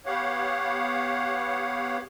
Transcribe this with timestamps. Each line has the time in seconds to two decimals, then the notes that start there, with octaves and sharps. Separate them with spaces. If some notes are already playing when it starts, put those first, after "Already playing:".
0.06 B3 G4 C#5 F5 F#5